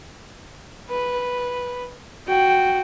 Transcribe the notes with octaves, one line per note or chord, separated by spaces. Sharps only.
B4
F#4 G5